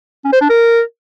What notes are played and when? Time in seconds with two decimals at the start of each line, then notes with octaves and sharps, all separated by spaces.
0.25 C#4
0.33 C5
0.41 D4
0.49 A#4